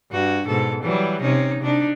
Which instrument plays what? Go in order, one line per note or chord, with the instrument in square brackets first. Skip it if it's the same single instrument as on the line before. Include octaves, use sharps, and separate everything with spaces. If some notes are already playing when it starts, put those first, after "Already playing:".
[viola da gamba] G2 F#4
G#2 B2 A4
E3 F#3 G3
C3 C#4 D#4
C3 D4 D#4